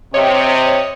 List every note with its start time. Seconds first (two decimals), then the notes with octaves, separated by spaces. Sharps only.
0.14 C3 C4 C#5 D#5